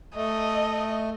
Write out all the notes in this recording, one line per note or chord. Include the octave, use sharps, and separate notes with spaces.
A3 D#5